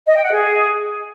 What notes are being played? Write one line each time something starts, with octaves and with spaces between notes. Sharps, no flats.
D#5
G5
F#5
G#4